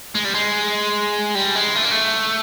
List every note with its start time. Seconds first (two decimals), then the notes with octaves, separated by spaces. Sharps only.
0.15 G#3
0.25 G3
0.34 G#3
1.35 G3
1.55 G#3
1.75 A3
1.83 A#3
1.91 A3